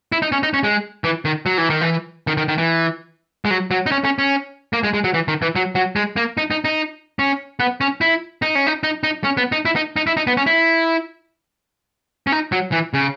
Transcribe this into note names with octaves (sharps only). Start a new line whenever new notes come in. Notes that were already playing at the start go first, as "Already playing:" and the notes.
E4
D#4
C#4
D#4
C#4
G#3
E3
D#3
F#3
E3
D#3
E3
D#3
D#3
D#3
E3
G#3
F#3
F#3
D#4
C#4
C#4
C#4
A#3
G#3
G#3
F#3
E3
D#3
E3
F#3
F#3
G#3
A#3
D#4
D#4
D#4
C#4
B3
C#4
E4
D#4
C#4
D#4
D#4
D#4
C#4
B3
D#4
E4
D#4
D#4
E4
D#4
B3
C#4
E4
C#4
D#4
F#3
E3
C#3